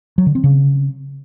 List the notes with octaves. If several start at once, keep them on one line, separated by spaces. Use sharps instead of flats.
F#3
D3
C4
C#3